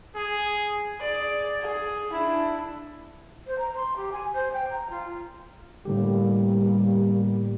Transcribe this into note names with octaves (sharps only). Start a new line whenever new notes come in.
G#4
G#4 D5
G#4
D4 E4
C5
A#5
C6
G4
G#5
C5
G5
A#5
F4
A2 D3 G3 A#3 G4